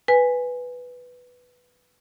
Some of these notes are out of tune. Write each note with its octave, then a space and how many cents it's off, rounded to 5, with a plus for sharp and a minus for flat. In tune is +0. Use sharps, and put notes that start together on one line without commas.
B4 +0 G#5 -5